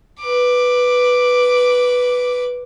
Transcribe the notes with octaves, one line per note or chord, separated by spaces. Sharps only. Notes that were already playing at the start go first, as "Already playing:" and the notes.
B4 D6